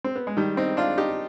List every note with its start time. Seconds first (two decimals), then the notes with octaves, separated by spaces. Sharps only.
0.04 C4
0.16 B3
0.27 G#3
0.37 D#3 G3
0.57 C4 D#4
0.77 D4 F4
0.97 D#4 G4